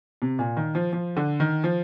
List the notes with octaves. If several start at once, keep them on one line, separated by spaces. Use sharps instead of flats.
C3
A#2
D#3
F3
F3
D3
D#3
F3